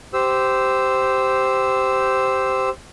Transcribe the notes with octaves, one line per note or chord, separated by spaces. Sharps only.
G4 C5 E6